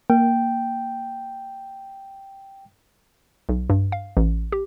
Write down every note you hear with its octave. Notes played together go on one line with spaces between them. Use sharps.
A#3 G5
B1
G2
F5
A1
G4